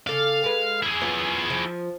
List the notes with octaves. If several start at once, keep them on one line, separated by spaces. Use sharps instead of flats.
C#3 A4 D5 F5
G#3 B4
E4 G#4
F#2 B3 F4
F3